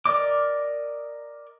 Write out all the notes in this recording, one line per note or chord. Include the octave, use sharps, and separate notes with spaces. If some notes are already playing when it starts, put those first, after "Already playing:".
A#4 D5 D#5 D6